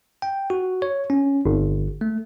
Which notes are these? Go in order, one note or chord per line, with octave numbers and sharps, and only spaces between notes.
G5
F#4
C#5
C#4
G1
A3